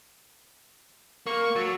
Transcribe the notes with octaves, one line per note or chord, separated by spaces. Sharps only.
A#3 C#6
C#6
F#3 A4